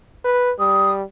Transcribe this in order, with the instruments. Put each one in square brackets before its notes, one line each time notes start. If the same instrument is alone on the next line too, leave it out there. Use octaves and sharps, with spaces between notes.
[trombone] B4
[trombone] G3 [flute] D#6